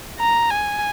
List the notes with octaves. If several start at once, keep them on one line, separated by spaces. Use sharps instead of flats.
A#5
G#5